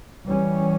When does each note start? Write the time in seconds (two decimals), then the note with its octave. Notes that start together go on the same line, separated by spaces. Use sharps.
0.26 E3 G3 C#4